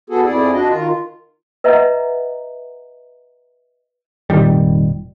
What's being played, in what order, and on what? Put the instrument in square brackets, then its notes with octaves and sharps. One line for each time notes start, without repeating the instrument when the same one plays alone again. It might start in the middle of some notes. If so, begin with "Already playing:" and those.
[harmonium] B3 F#4 G#4 A4
F2 E4 G#4 D5
D4 F#4 D#5
D#3 F4
[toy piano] B4 D#5 E5 F#5 A#5
[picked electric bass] F1 A#2 D#3 G3